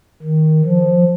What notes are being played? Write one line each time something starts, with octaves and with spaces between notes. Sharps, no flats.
D#3
F3